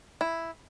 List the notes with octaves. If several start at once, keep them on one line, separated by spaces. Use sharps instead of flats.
E4